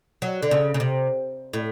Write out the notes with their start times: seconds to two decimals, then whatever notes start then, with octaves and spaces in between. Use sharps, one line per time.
0.22 F#3
0.43 D3
0.51 C#3
0.74 C#3
0.80 C3
1.53 A2